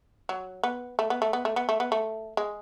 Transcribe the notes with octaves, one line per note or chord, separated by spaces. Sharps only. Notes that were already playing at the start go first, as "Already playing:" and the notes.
F#3
B3
A3
B3
A3
B3
A3
B3
A3
B3
A3
G#3